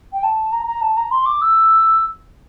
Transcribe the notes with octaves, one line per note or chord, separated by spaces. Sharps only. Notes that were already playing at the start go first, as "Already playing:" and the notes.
G5
A5
A#5
A#5
A5
A#5
C6
D6
E6